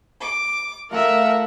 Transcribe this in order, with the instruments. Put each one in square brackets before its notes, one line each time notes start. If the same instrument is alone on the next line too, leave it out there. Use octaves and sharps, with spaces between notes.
[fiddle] D6
[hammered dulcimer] A3 F4 A4 [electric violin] A#4 E5 [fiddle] F#5